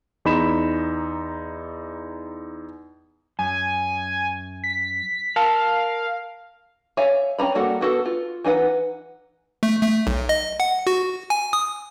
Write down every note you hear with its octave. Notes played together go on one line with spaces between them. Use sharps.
E2 D#4 B5 E7
F#2 G#5
B6
A#4 F5 A5
C#5 E5 F5 G#5
C4 C#4 A#5 B5
G3 A#3 F#4 A4 F#5
B3 F#4 A4
F4
E3 D#4 B4 F#5
A3
A3
B1
D#5
F#5
F#4
G#5
D#6